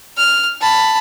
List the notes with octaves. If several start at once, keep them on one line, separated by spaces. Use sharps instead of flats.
F6
A5 B5